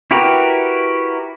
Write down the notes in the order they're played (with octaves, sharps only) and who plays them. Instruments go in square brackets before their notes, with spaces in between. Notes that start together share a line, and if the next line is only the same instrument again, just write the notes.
[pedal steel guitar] E4 F#4 G4 A#4 B4